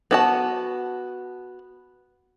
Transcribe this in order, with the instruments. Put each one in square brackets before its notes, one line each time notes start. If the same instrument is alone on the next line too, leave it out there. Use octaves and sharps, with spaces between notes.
[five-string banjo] B3 F#4 A5